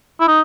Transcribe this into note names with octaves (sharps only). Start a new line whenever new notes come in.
E4
D#4